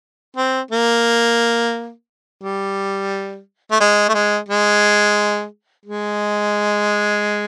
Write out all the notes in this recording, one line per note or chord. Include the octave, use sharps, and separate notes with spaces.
C4
A#3
G3
A3
G#3
A3
G#3
G#3
G#3